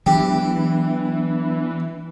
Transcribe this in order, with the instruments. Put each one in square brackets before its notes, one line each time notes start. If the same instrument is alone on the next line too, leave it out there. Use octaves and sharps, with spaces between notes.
[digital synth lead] E3 [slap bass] F#3 G#3 [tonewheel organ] B3 D4 [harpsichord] G4